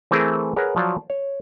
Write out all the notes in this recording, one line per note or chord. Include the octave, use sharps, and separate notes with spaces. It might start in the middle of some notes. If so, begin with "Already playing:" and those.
E3 A3 C4 G#4 A#4 E5
G#4 A#4 B4 C#5 F#5
F3 F#3 D5 F5 A5
C#5